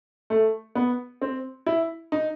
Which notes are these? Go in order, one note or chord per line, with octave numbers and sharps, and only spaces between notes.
A3
B3
C4
E4
D#4